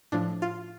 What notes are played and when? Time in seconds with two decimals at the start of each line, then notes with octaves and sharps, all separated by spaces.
0.12 A2 F3 D4
0.42 F4